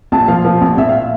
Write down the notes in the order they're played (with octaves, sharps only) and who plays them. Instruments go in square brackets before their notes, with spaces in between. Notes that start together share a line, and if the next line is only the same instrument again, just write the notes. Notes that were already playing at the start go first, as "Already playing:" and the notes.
[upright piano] A#1 A5
F3 F5
F3
A#1
A#1 E5
F5
E5